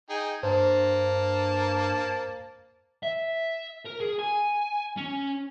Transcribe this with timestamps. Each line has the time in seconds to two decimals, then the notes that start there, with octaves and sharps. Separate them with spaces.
0.09 D#4 G#4 G5
0.43 G2 A#3 C5 A5
3.03 E5
3.86 A#4
4.01 G#4
4.19 G#5
4.97 C#4